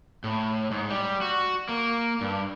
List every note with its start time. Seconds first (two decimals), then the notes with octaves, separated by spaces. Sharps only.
0.24 A2
0.71 G#2
0.90 G3
1.21 F#4
1.69 A#3
2.21 G2